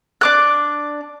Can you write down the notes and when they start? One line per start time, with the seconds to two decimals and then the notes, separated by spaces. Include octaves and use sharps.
0.21 D4 D6 F#6